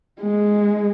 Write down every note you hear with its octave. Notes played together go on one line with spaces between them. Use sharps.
G#3